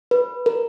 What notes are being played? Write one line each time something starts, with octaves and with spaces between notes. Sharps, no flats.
B4
A#4